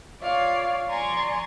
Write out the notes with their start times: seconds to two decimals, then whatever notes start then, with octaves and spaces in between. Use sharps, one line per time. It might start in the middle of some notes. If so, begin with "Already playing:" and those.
0.20 F4 C#5 D5 F5
0.89 D5 G#5 A#5 C6 C#6